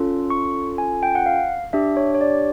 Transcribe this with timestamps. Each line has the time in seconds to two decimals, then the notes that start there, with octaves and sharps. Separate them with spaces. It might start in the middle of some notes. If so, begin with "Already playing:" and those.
Already playing: C#4 F4 A4
0.30 C#6
0.78 G#5
1.03 G5
1.15 F#5
1.26 F5
1.73 D4 G4 E5
1.97 C#5
2.14 C#5
2.21 D5